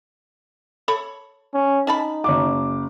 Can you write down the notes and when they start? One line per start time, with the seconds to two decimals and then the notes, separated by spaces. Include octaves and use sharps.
0.88 A4 C#5 B5
1.54 C#4
1.87 C#4 D#4 A5 B5
2.24 F#1 D6